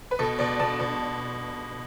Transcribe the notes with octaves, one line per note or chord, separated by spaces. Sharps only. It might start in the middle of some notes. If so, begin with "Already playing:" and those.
B4
B2 A4
B2 D5
B2 A5
B2